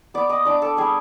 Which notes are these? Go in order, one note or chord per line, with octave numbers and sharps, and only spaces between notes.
B3 D5 D6
D#5 D#6
D4 D5 D6
A4 A5
G3 G#4 G#5